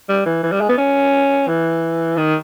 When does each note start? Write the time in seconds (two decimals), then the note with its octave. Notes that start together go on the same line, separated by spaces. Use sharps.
0.09 G3
0.26 E3
0.43 E3
0.52 G3
0.61 G#3
0.69 B3
0.78 C#4
1.48 E3
2.17 D#3